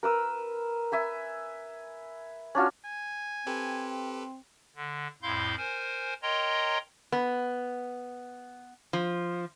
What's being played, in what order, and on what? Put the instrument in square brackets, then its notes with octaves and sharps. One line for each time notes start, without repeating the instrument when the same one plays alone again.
[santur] A#4 B4 E6
E5 G#5 B5
C#4 D4 F4 F#4
[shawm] G#5
[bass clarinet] C4 [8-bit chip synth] G4 A4 B4
[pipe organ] D3
F2 A2 E4 F5 C6 G6
A#4 C5 G#5
A#4 C#5 D#5 G5 A#5 C6
[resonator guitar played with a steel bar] B3
F3